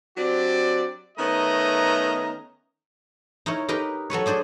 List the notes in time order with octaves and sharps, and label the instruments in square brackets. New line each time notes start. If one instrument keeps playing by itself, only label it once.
[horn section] F#3 C4 D4 F#4 G4 D5
D#3 A3 B3 C#4 D#5 A#5
[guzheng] D#4 E4 A#4 C#5
D#4 G4 A#4 B4
F#3 A4 B4 C#5
D4 G#4 C5 D5